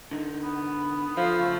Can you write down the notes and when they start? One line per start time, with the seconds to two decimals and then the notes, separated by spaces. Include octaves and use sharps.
0.11 D3 D#4
0.44 B3
1.17 F3 A4 F5
1.39 C#3 A3